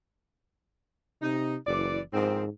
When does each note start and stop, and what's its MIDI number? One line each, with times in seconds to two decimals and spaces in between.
1.22 1.56 48
1.22 1.54 63
1.67 1.99 30
1.67 1.99 52
1.67 1.99 74
2.13 2.49 44
2.13 2.43 51
2.13 2.43 53
2.13 2.43 60